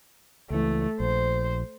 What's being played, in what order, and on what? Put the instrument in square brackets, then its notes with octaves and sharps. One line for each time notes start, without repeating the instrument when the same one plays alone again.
[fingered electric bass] C#2 E3 [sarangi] A3
[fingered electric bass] A#1 [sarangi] C5